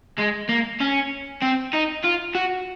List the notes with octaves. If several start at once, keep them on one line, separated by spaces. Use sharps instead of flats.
G#3
A#3
C#4
C4
D#4
F4
F#4